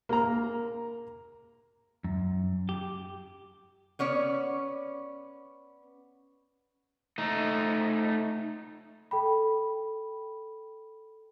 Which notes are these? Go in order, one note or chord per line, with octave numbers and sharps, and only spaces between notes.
A#3 A#5
F#2
G4
B3 C#4 C#5 D5
A3 D#4
A4 G5 B5